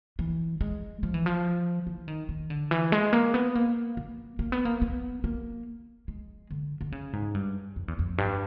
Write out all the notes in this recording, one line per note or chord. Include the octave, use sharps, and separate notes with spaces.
E3
G#3
F3
E3
F3
E3
D#3
D#3
D3
E3
G#3
A#3
B3
A#3
A#3
A#3
B3
A#3
B3
A#3
G#3
D3
D3
C#3
G#2
G2
F2
E2
F2
G2